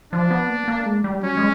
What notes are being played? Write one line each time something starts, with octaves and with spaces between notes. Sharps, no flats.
F3 D4
B3
A#3
A#3
G#3
G3
F#3 C#4
G#3